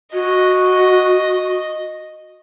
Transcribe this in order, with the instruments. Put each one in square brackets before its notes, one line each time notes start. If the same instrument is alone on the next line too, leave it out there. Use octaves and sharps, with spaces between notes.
[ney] F#4 [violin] D#5